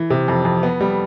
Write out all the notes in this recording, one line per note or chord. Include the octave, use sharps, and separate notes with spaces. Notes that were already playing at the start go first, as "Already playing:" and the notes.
Already playing: E3
C3
F2
F2
B3
G3